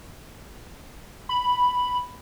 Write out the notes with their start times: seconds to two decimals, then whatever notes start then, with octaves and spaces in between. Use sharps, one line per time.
1.29 B5